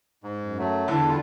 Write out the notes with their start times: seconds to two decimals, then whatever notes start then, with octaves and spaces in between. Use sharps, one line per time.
0.23 G#2
0.38 F#2
0.60 F#3 A3
0.88 E2 D3 E3 A4 A5
1.08 G3 F4